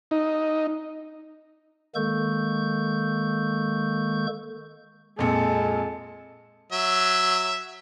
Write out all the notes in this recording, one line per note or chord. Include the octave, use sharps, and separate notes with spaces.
D#4
D#3 G#3 A#3 A4 C#6 G6
F2 A#2 G#3 A4
F#3 E5